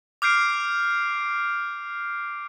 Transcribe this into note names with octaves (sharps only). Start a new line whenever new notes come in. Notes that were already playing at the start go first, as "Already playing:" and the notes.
D6 F6 G6 C7 D7